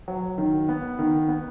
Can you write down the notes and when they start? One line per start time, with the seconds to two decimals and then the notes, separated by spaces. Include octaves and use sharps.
0.08 F#3
0.38 D#3
0.69 B3
0.99 D#3
1.29 B3